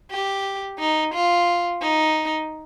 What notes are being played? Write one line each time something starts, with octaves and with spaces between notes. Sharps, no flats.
G4
D#4
F4
D#4